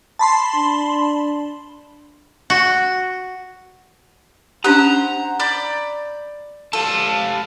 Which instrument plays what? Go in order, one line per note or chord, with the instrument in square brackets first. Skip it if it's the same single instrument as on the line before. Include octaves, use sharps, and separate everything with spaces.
[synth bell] A5 B5 C6
[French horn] D4
[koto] F#4
[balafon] C#4 D4 G4 [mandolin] C5 F#5 [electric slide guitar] A#5
[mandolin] D5 B5 G6
[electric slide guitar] G4 F5 A5 [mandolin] A4